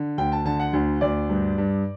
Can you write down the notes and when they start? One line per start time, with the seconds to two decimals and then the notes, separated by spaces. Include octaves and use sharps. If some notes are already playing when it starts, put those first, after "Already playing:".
Already playing: D3
0.18 D2 G5
0.32 A5
0.45 D3 A5
0.60 F#5
0.73 D2
1.01 D2 D5
1.30 G2
1.58 G2